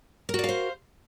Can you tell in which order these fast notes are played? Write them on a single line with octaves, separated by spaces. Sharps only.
A#4 F#4 D5 F5 C5